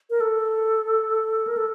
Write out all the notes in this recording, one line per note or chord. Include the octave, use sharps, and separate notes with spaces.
A#4
A4
A#4
A4